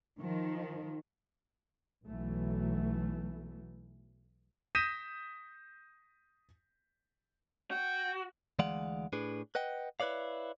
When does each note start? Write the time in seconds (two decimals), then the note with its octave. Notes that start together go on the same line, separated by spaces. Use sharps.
0.18 D#3 F3
2.05 B1 B2 E3 F#3 A3
4.75 D#6 G6 A#6 B6 D#7 E7
7.71 F#4 G5
8.59 D2 E3 G#3 D5 F5 F#5
9.13 A2 D4 G#4 B4
9.55 B4 D#5 F#5 G5
10.00 E4 B4 C#5 D5 F5